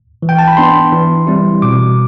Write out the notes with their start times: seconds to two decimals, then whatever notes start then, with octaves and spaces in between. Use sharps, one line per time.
0.22 E3
0.29 G5
0.39 A5
0.48 B5
0.57 B3 D4 C6
0.92 E3
1.27 G3 C4 E4
1.62 B2 D6